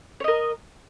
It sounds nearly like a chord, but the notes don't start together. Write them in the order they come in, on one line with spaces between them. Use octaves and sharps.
C#5 D#5 A#4